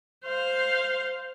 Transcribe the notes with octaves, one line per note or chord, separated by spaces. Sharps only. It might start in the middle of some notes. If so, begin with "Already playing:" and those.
C5 F5